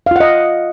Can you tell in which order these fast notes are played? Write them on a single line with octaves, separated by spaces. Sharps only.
F5 F4 F#5 D#5